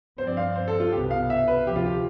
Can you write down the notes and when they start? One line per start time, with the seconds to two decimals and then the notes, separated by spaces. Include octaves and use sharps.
0.18 G2 F3 C4 C5
0.27 D5
0.37 F5
0.56 C5
0.68 A4
0.80 F4
0.92 C2 B2 B3 G4
1.11 F5
1.30 E5
1.48 B4
1.66 D2 C3 F3 G4
1.76 F4
1.86 G4